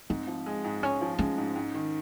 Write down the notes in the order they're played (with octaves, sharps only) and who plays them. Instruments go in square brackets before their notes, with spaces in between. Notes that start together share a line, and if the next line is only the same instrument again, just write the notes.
[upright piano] G#2 [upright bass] C4
[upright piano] F3
G#3
G#2
[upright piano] G#2 [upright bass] C#4
[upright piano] F3
[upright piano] G#3 [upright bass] C#4
[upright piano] G#2
G#2
D#3